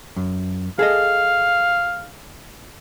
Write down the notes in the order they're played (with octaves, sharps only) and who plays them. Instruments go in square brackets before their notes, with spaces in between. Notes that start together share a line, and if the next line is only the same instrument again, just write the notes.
[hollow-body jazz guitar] F#2
[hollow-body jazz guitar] G#4 A4 D#5 [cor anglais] F5